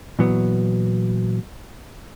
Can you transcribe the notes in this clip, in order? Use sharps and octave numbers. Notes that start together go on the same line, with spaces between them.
A#2 E3 F#3 B3